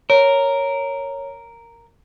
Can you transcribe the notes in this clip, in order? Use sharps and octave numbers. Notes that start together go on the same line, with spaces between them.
A#4 C#5